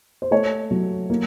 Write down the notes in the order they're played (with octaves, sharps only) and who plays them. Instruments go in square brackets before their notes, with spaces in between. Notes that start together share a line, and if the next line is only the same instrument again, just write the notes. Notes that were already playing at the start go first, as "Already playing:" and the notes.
[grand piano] C5
A3 C#5
F#3
A#3